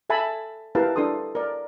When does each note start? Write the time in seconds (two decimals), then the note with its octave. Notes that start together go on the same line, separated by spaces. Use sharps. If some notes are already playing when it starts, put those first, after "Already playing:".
0.10 A4 E5 G#5 A5 B5
0.75 E4 G4 A#4 B4 F5 A5
0.96 D4 E4 A4 C6 D#6
1.35 A#4 D5